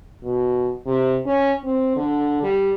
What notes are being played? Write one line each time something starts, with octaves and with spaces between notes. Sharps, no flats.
B2
C3
C#4
C4
D3
G3